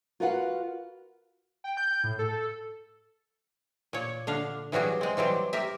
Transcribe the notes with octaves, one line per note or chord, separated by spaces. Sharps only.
F4 F#4 A#4 B4 F5 F#5
G5
G6
A2
A4
A#2 C#5
D3 D4 F5
E3 F#3 G3 F#4 G#4
G#3 C4
E3 F#3 G3 C4
G4 A#4 E5